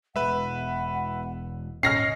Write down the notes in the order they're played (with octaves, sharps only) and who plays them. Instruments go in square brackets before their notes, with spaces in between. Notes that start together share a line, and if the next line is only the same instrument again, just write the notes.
[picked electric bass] E1 E2 G#3 [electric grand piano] B4 E5 [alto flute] F#5
[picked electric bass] A#1 G#2 C#3 [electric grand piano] C#4 [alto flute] D#5 [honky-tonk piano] F6 A#6 C7